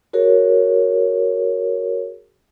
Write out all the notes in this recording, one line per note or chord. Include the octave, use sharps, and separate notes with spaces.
F#4 G#4 A#4 C#5